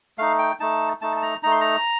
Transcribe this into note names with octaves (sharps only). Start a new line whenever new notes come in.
A3 D#4 F5
G5
A3 D#4 A5
A3 D#4 A5
A5
A#5
A3 D#4 A#5
C6
A#5